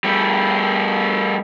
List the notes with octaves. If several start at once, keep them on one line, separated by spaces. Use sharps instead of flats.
G3 A3